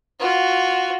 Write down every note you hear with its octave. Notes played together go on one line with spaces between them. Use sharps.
F4 F#4